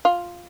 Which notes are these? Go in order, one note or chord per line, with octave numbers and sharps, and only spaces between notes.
F4